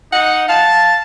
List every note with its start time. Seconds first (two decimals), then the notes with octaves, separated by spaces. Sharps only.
0.12 D#4 F#5
0.49 F5 A5